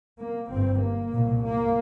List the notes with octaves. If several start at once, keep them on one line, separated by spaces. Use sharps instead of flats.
A#3
G1 G2 C4
A#3
C2 A#2
A#3